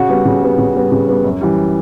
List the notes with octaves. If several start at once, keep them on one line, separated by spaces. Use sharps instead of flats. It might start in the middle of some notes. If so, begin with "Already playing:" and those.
Already playing: C#3 F#4
G3 B3
C#3
G3 B3
C#3
G3 B3
C#3
G3 B3
F#2
E3 G3